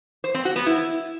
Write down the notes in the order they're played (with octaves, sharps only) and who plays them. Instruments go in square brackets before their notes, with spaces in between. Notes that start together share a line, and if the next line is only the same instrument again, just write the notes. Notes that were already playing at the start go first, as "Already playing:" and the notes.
[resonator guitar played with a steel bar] C5
C4
F#4
B3
E4